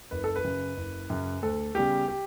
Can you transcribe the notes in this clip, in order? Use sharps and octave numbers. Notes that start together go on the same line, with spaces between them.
F#1 B4
A4
B4
F#2 C#3
F#1
F#2 C#3
D2 A4
C#3 G3 B3 G4
G4